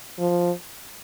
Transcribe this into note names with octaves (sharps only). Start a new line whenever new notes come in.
F3